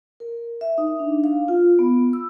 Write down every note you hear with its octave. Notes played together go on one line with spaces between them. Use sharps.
A#4
E5
D#4
D4
F5
F4
B3
E6